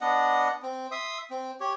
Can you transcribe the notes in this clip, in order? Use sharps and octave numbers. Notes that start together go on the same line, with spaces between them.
B3 D4 D#5 F#5
C4
E5 C6 D#6
C4
G4 C#5